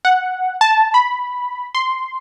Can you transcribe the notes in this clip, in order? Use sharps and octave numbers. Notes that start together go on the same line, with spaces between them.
F#5
A5
B5
C6